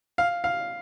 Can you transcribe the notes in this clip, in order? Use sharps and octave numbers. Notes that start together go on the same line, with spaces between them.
F5
F5